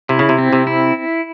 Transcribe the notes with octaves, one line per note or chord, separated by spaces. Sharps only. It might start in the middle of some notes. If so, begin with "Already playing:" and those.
C3 E4
C#3
C3
C4
C3
E4